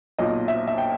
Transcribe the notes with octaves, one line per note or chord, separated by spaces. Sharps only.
B1 A#2 D#5
E5
E5
G5